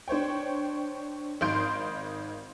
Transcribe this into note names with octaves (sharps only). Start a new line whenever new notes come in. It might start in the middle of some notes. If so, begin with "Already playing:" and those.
D4 C5 C#5 G5
G#1 D#4 F5 C6 G6 D7